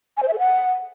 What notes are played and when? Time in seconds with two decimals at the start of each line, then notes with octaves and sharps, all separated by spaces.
0.17 G#5
0.23 C5
0.28 E5
0.33 A4
0.39 F#5